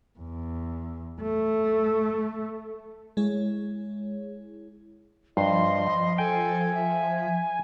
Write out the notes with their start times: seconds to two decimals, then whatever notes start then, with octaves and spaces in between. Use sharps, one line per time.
0.19 E2
1.22 A3
3.17 G#3 E4 G#4 C#5
5.37 G2 F3 D#5 C6
6.18 A4 G5 G#5
6.74 E5